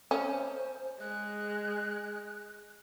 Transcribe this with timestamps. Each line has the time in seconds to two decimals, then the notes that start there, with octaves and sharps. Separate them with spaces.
0.11 C#4 C5
1.00 G#3 F#6